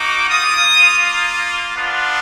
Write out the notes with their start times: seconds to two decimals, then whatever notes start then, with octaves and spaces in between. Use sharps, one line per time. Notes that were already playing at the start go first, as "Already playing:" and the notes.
Already playing: A#3 D#4 F#4 D6
0.28 A#3 F4 D#6
1.74 B3 D4 F4